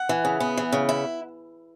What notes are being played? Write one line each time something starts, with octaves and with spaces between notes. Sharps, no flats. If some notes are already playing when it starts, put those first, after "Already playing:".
Already playing: F#5
E3
C#3
B3
E3
C#3
E4